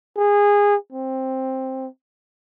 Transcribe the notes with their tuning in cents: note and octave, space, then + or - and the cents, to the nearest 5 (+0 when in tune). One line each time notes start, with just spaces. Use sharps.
G#4 -20
C4 +10